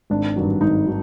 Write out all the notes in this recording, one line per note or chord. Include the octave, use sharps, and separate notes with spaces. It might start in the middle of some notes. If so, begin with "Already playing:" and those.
G#1 D4
G2 D#3 F#3
G#1 D#4
D#3 F#3